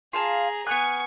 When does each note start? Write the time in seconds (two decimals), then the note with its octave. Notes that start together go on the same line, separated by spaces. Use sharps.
0.13 F4 G#4 F5 A5 A#5
0.67 B3 G#5 C#6 F6 F#6